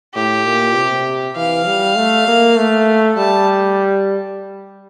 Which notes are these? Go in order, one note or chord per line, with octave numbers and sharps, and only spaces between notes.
A2 G4
A#2
C3
E3 F5
G3
A3
A#3
A3
G3 A5